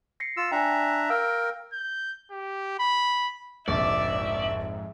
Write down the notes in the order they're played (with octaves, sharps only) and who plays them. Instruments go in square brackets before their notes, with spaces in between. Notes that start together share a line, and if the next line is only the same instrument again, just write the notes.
[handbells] A#6 C7 C#7
[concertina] F4 E6
[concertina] D4 E5 A#5 [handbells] G5 G#5
[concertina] A#4 G5 [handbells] F5 E6 A#6
[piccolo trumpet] G6
G4
B5
[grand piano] F1 A#1 [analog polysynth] F2 G#2 [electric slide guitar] D5 [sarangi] E5